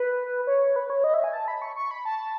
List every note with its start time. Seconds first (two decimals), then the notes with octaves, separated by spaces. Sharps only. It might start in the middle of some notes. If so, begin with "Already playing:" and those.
Already playing: B4
0.47 C#5
0.76 B4
0.90 C#5
1.04 D#5
1.14 E5
1.24 G#5
1.33 A5
1.48 B5
1.62 C#6
1.76 C#6
1.91 B5
2.05 A5